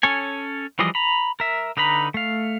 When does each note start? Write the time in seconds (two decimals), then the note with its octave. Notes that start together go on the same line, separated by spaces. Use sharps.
0.03 C#4 A4 C#5 G#5
0.79 E3 F3 G3 G#4 D#5
0.95 A#5 B5
1.40 A#4 E5
1.77 D3 D#4 B4 A#5 B5
2.14 A3 F5